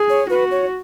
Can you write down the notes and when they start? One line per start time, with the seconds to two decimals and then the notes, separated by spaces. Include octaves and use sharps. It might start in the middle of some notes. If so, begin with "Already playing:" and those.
Already playing: G#4
0.10 C#5
0.30 F#4 B4
0.51 C#5